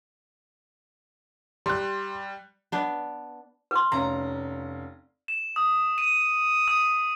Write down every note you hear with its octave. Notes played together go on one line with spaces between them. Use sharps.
G3 C6 F#6
B3 D4
B4 C6
F1 C#4 F5 A#5
E7
D#6
D#7
D#6